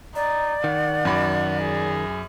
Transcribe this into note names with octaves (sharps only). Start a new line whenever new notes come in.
D#4 D5
D#3 F#5
F#2 B5 D6
G#4